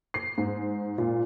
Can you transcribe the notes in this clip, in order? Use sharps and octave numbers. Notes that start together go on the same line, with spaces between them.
C7
G#2
A#2